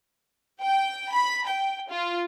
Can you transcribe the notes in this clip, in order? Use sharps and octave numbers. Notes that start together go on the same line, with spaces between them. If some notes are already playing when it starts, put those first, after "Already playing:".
G5
B5
G5
F4